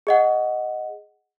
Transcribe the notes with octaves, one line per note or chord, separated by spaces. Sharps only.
G#4 D#5 F#5